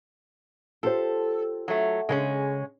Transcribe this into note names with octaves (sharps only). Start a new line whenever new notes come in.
F4 G4 A4 C5
F#3 A3
C#3 G#3 A#3 C#4